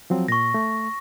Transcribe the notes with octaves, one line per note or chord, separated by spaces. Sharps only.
F3 F#3 C4
A#2 C#6 A#6
A3